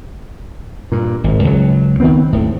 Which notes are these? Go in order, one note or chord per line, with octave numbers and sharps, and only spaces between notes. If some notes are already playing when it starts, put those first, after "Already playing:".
G2 A#2
G#1
C#2 F#3
D#3 E3 B3 C4
D#1 A2